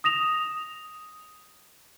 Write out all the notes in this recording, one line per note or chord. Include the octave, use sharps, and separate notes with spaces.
D#6 A#6 E7 F7